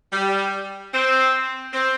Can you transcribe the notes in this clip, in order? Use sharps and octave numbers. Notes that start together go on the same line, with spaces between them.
G3
C4
C4